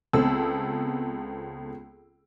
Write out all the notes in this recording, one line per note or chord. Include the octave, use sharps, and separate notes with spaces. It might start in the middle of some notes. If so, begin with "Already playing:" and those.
C#2 B3 C4 A4 E6